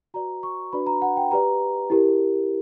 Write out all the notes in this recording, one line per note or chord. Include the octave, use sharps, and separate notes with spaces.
F#4 B4 D5 A#5
C#6
D4 F#4 B4 D5 B5
A#5
F#5
G5
G4 B4 D5 A#5
E4 G4 A#4